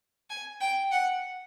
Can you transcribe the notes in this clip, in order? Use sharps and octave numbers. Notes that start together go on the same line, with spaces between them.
G#5
G5
F#5